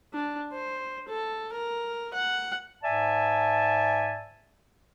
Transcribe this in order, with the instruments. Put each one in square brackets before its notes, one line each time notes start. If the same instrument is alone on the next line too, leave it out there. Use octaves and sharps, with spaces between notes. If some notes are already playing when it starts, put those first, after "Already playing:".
[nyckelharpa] D4
C5
A4
A#4
F#5
[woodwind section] G#2 D5 E5 G#5 A5